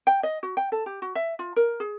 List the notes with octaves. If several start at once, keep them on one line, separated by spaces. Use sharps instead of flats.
G5
D#5
F#4
G5
A4
G4
F#4
E5
F4
A#4
G#4